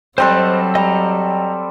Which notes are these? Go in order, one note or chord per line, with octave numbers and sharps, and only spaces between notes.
F#3 G3 C4 A4 C5 D#5 F#6
G3 D#5 A#5